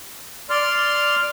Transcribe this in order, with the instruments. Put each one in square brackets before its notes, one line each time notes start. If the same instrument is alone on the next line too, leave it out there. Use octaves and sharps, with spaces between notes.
[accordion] D5 C6 F6